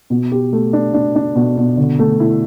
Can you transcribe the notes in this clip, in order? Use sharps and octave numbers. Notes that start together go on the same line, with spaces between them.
B2
G4
A3
D4
D4
D4
B2
B2
D3
A3
E4